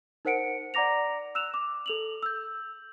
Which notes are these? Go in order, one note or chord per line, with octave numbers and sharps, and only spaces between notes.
D#4 A#4 C5 F#5 C#7 D7
D5 F#5 A#5 D6 A#6 F7
E6 F#6 E7 F7
D6
A4 F7 F#7
E6 G6